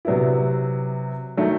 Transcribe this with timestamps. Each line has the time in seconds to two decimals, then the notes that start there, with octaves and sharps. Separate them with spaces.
0.05 C3 F#3 B3 E4
1.37 D#3 F#3 A3